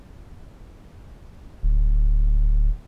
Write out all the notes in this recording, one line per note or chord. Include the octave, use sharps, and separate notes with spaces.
D1